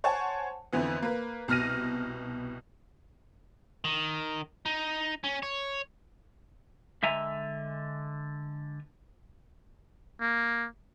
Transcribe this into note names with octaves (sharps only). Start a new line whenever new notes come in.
C5 C#5 F#5 G#5 A5
F2 D3 E3 B3
A#3 B4
C2 B2 F6 A#6 D#7
D#3
D#4
C#4
C#5
D3 G#3 E5 G#5 A#5
A#3